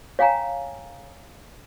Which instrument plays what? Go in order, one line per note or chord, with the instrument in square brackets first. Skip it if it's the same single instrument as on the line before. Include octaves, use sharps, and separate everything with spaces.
[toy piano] C#5 F5 G5 G#5 A#5